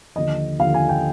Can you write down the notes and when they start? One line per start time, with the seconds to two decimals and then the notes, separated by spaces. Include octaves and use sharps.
0.16 D#2 D3 F3 D#5
0.60 D#2 D3 F3 F5
0.74 G#5
0.89 G5